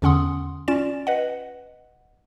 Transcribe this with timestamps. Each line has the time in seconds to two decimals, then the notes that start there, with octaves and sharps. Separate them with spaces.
0.02 E2 D3 C#4 F#5 C6 D#6
0.68 C#4 F4 D5 A6 E7
1.07 B4 D#5 F#5